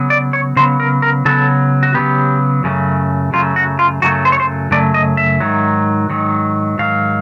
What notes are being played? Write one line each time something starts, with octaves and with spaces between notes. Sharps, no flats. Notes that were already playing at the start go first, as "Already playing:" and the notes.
Already playing: C#3 F#3 B3
D5
C#5
C#3 F#3 B3 C5
A#4
A#4
C#3 F#3 B3 A4
F#4
C#3 F#3 B3 G4
F#2 C#3 F#3 A3
F#2 C#3 F#3 A3 F4
F#4
F4
F#2 C#3 F#3 A3 F#4
C5
C#5
C5
F#2 C#3 F#3 A3 D5
D#5
E5
G#2 D#3 F#3
G#2 D#3 F#3
G#2 D#3 F#3 F5